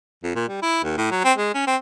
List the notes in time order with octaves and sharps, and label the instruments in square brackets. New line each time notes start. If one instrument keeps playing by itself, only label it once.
[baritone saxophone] F2
A#2
G3
E4
D#2
A2
F#3
C4
G#3
C#4
C4